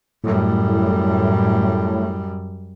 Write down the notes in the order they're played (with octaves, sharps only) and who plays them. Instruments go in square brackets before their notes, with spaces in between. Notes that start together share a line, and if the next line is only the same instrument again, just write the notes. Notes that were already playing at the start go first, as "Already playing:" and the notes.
[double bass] F#2 G3 [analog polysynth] A2